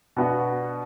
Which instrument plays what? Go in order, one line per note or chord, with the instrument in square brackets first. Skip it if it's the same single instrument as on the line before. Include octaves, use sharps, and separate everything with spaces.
[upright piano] B2 B3 D4 F#4